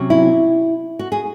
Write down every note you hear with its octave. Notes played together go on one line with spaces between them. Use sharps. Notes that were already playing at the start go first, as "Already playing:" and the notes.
Already playing: C3 F#3 C#4
E4
F#4
G#4